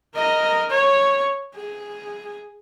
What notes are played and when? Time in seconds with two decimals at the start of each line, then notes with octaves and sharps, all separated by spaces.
0.15 A#4 D#5
0.71 C#5
1.55 G#4